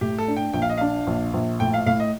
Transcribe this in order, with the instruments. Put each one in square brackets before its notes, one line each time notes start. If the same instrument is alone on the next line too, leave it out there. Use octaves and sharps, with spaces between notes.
[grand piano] A2 [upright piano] G4
[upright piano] A4
[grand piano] D4
[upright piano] G5
[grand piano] A#1 [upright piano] G5
[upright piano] F5
D#5
[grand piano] D4 [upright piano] F5
[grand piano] A#1
A#1
[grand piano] A2 [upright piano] G5
[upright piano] F5
[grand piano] A2 [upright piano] F5
[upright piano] D#5